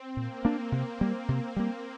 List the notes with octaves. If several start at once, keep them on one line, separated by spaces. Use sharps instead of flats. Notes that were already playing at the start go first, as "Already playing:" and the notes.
Already playing: C4
A#2 A#3
A#3 D4
C3
G3 A#3
C3
G3 A#3